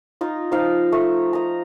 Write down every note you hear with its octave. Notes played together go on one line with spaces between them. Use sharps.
D#4 F4 D#5
F3 D#4 F5
A3
D#5 A#5